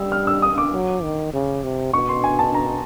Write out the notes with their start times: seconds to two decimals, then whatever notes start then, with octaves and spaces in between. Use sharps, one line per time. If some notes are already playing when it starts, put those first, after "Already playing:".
Already playing: G3 E6
0.12 F6
0.27 E6
0.42 D#6
0.58 D6
0.73 F#3
1.03 D#3
1.33 C#3
1.63 C3
1.93 B2 C#6
2.09 C6
2.24 G#5
2.39 A5
2.54 A#5